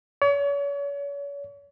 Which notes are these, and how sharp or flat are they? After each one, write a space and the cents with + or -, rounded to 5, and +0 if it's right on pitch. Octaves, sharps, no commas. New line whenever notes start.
C#5 +40